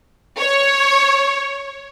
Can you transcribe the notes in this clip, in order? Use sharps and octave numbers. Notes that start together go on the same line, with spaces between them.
C#5